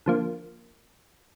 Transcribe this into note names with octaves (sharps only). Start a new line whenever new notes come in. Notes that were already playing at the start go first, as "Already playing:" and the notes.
D3 F3 A#3